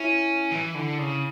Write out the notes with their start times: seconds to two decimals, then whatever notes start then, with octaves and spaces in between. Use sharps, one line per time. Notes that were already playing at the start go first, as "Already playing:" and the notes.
Already playing: C#4 E4
0.51 E3
0.75 D3
0.98 C#3